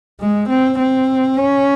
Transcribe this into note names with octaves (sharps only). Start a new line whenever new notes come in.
G#3
C4
C4
C#4